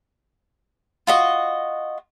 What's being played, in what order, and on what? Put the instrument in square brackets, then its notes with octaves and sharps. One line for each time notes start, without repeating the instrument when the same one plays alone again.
[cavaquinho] F4 F#4 D#5